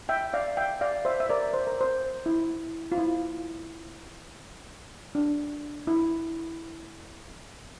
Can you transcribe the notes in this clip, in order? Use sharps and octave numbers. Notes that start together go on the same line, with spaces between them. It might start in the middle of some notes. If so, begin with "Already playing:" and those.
E5 G5
D5 F5
E5 G5
D5 F5
C5 E5
E5
A#4 D5
C5
A#4
C5
E4
F4
E4
D4
E4